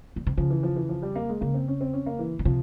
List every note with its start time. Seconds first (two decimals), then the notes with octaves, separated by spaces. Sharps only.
0.16 A#2
0.27 C3
0.37 C#3 F3
0.50 E3
0.63 F3
0.76 E3
0.89 F3
1.02 G3
1.15 A#3
1.29 G#3
1.41 C#3 A#3
1.54 C4
1.68 C#4
1.81 C4
1.93 C#4
2.06 A#3
2.19 E3
2.39 A#2
2.45 C3 F3